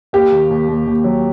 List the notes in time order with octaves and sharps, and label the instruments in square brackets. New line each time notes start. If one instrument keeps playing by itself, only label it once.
[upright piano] A#3 [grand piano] G4
[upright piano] D#2
D#2
D#2
D#2
F#3